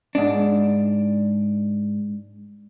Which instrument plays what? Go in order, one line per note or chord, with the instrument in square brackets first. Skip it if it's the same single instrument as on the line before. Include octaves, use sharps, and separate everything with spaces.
[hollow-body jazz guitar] G#2 D4